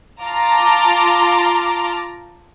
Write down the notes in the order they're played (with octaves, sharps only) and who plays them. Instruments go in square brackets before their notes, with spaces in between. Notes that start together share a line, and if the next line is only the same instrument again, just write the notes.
[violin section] F4 A5 A#5 D6